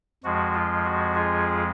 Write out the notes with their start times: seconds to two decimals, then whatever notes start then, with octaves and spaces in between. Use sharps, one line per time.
0.24 F2 F3 G#3 F#4
0.55 F4
0.85 F#4
1.15 F4 G#4